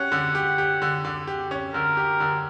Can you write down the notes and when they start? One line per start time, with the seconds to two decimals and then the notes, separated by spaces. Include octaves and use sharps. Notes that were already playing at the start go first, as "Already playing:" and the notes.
Already playing: C#4 G4 F#5
0.12 D3
0.35 G4
0.58 G4
0.82 D3
1.05 D3
1.27 G4
1.51 C#4
1.74 D3 A#4
1.97 G4
2.20 D3